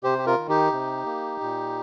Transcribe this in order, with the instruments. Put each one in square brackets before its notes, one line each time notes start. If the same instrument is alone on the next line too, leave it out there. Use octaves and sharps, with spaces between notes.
[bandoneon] C3 G4 C5
G4
F4 A#4
D#3
D#4 G4
C3
A#3
A#2